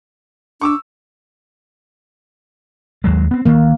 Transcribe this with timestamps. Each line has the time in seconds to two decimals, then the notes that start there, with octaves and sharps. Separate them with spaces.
0.61 D4 C#6 D6 E6
3.04 D#2 F#3 G#3
3.31 B3 C4
3.46 D2 D#3 A#3